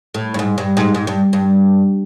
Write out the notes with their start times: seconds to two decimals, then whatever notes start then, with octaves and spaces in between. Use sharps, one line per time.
0.14 A2
0.34 G2
0.39 G#2
0.58 G2
0.77 G#2
0.95 G#2
1.07 G2
1.33 G2